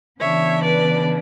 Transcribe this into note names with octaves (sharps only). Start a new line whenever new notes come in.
C#3 E3 B3 D4 C#5 E5
B4 D5